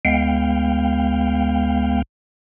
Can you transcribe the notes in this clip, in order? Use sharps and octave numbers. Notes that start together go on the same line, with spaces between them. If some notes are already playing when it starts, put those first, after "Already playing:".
D2 G#3 B3 F5 G5